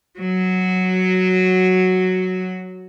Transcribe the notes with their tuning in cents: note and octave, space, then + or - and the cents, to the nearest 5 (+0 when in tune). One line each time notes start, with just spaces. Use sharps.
F#3 +0 F#4 +0